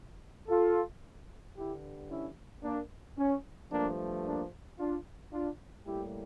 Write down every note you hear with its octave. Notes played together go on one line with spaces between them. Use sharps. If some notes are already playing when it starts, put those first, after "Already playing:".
F4 A4
G2 D3 G3 E4 G4
C#4 E4
A#3 D4
C#4
G2 F3 A3 A#3 D4
A#3 D4
D4 F4
D4 F4
A2 G3 A#3 E4 G4